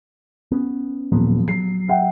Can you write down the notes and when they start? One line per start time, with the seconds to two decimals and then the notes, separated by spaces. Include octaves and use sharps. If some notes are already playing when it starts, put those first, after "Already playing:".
0.52 B3 C#4
1.12 D#1 F3 F#3 B3
1.48 F#3 C7
1.88 E5 F#5 G5